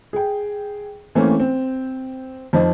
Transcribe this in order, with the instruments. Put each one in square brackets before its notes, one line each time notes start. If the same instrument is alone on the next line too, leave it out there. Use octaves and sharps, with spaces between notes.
[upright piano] G#4 G5
E3 A3 A#3 C4 C#4
C4
F2 F3 D#4